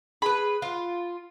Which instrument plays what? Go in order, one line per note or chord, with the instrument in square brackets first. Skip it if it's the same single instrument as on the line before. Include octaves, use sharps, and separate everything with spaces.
[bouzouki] G#4 B4 [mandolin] B5
[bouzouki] F4